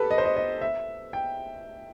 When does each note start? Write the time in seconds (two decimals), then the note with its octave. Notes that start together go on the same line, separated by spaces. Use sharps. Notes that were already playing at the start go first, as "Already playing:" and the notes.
Already playing: G4 A4 B4
0.11 D#5
0.18 C5
0.25 D#5
0.36 D#5
0.61 E5
1.13 G5